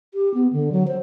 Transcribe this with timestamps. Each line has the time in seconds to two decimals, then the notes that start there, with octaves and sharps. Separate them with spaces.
0.14 G4
0.34 B3
0.53 D3
0.72 F#3
0.87 C5